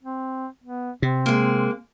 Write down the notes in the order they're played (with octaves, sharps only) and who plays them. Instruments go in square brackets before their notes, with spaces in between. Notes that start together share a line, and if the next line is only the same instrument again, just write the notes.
[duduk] C4
B3
[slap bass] C3 [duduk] C4
[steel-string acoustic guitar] G#3 A#3